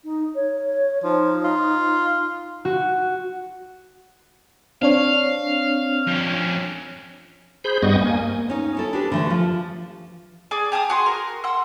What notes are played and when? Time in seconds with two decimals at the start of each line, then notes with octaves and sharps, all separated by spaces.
0.04 D#4
0.35 C#5
1.03 F3 D#4
1.44 F4
2.65 F#4
4.82 C4 D4 C#5 F5
6.07 F2 C#4
7.64 G#4 C5 B5 G6
7.83 G2 G3 B3 D#5 C#6 D#6
8.01 A#3 G#5
8.48 B3 C#4 D#4
8.75 D#4 E4 A4
8.93 D4 G4 B4
9.12 D3 E3 A3 F#4 A4
9.30 F3
10.51 G#4 D5 G#5
10.72 G4 G#4 A5 D#6
10.90 F#4 G#4 C6
11.06 A#4
11.44 F#5 C6 E6